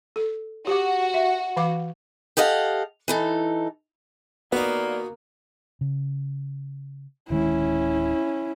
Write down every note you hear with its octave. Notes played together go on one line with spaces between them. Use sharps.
A4
F#4 G4 D6
E5
E3 F5 D6
G4 A4 D#5 F5 F#5
E3 D#4 A4
D#2 A#3 B3 D#4 F4 F#4 D5
C#3
D1 D#3 G#3 C#4 E4